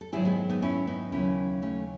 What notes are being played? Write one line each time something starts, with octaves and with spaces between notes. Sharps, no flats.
A4
G#2 D#3 F#3 E4 G#4
G#3 B3
B3 D#4
C#4 E4
B3 D#4
D#2 C#3 F#3 C#4 E4
A3 C#4